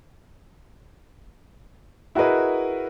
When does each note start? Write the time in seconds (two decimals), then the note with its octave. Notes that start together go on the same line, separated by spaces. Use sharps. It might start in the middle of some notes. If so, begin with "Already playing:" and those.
2.15 E4 F#4 G#4 A#4 B4 D#5